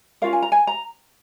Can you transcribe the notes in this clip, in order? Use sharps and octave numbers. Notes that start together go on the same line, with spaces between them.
C#4 F4 A#4 F5
G#5
A#5
G#5
A#5